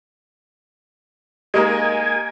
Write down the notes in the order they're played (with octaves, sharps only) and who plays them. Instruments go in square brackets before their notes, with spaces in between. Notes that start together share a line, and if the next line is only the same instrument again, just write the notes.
[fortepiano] G#3 A#3 D#4 [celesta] G4 [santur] A#4 D#5 [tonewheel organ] G#5